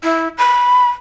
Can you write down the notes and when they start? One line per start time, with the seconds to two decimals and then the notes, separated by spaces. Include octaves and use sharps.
0.03 E4
0.38 B5